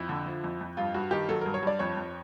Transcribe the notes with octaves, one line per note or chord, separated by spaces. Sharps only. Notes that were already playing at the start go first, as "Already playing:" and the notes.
Already playing: F2 E4
D3
F3
F2
F2
G2 F4
G2 F#4
D#3 G4
F#3 A4
G2 A#4
C#5
G2 D5
F2 C#5
F2